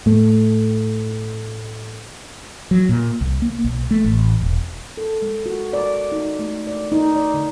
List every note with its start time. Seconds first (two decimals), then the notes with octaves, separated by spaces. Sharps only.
0.06 A2 A3
2.71 F#3
2.89 A#2
3.21 C2
3.42 A#3
3.64 B1
3.91 A3
4.04 A1
4.41 E1
4.97 A4
5.22 G#3
5.46 F#4
5.73 D5
6.12 D#4
6.39 A3
6.67 D5
6.92 D#4
7.16 D5
7.34 D3